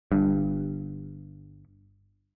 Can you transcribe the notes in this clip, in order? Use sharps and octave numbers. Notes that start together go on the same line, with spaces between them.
G1 G2